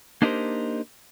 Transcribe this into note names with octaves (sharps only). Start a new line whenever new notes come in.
A#3 D4 D#4 G4 A#4 C5